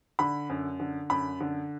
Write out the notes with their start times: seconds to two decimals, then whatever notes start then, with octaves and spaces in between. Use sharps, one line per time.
0.19 D3 B5
0.49 F#2
0.80 D3
1.10 F#2 B5
1.41 D3